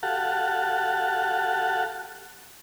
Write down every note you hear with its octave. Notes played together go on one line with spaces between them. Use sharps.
F#4 G4 A4 F5 F#5 A5